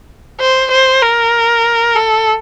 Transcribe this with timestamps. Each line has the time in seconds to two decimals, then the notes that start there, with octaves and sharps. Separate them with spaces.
0.40 C5
0.71 C5
1.03 A#4
1.96 A4